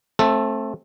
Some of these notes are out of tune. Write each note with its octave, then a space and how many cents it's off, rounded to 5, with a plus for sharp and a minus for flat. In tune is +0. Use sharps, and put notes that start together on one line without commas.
A3 +0 C4 +25 A4 +0